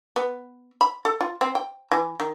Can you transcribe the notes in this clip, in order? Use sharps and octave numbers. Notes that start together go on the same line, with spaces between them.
B3
B5
A4
F4
C4
G5
E3
D#3